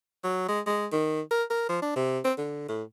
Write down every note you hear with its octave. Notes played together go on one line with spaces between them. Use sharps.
F#3
G#3
G#3
D#3
A#4
A#4
F3
D4
C3
C4
D3
A2